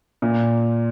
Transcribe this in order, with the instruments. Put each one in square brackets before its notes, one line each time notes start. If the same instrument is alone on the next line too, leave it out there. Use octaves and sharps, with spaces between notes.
[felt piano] A#2